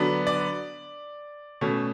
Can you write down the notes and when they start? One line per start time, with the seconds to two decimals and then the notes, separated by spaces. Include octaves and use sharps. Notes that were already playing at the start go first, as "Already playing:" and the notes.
Already playing: D3 F#3 B3 D4
0.27 D5
1.61 B2 A3 C#4